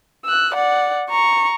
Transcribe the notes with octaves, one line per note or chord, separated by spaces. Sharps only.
E6 F#6
D5 F#5
A#5 C#6